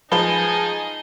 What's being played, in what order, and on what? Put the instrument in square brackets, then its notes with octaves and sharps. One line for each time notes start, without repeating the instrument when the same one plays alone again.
[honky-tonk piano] F3 [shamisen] G#3 B4 [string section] D#4 G#4 [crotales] G7